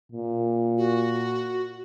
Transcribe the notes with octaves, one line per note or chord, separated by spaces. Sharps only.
A#2
F#4